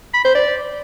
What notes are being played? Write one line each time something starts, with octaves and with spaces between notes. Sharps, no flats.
B5
C5
D5